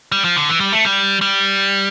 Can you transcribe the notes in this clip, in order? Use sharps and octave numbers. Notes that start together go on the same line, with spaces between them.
G3
F3
D3
E3
G3
A3
G3
G3